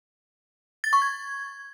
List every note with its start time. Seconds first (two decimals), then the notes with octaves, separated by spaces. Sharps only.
0.84 A6
0.93 C#6
1.02 G#6